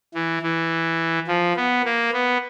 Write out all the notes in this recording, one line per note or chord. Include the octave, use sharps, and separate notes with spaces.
E3
E3
F3
B3
A#3
B3